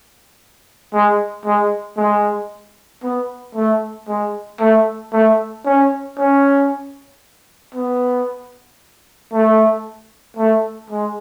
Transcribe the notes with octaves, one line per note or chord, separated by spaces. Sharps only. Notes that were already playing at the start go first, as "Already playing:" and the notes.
G#3
G#3
G#3
B3
A3
G#3
A3
A3
C#4
C#4
B3
A3
A3
G#3